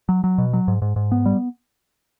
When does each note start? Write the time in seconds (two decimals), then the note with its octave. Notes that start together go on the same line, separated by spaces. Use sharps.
0.09 F#3
0.24 F#3
0.38 B2
0.53 F#3
0.68 G#2
0.82 G#2
0.96 G#2
1.12 B3
1.26 G3